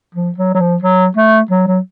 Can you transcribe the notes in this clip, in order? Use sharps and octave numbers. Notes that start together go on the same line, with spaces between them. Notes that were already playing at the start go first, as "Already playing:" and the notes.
F3
F#3
F#3
F3
F#3
A3
F#3
F#3